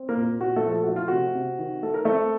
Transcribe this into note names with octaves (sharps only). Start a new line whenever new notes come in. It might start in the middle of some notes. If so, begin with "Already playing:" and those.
Already playing: C4
A#3 A#4
A#2
A#2 F#4
A3 A4
F3
A4
A3 F#4
F4
C3 F#4
C3
D#3
A3 A4
A#4
A3 C4 A4